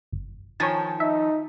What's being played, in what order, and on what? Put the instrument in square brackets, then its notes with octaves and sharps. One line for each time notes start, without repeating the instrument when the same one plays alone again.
[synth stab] G1
[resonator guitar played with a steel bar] D#3 F3 [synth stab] C#5 G#5 A5
[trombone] D#4 [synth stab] E5